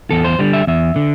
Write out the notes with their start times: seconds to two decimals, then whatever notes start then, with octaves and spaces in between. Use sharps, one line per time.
0.10 E2 A4
0.24 C5
0.39 D3 G3
0.53 E5
0.67 E2 E5
0.96 D3